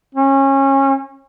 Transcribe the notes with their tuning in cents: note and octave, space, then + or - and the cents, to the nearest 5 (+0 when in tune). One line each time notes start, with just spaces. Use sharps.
C#4 -25